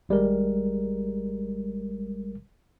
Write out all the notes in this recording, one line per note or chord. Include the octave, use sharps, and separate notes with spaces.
G#1 G3 G#3 A#4